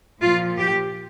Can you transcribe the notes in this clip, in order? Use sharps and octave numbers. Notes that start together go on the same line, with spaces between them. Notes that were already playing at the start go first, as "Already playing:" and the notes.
A#2 F3 F4
G4